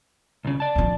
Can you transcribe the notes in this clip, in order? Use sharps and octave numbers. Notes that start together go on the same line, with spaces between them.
C2 C#3
D5 A5
A#1 C4